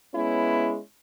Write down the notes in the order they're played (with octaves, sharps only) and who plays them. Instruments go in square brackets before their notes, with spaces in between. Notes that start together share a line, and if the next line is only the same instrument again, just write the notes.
[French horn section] G#3 B3 C#4 E4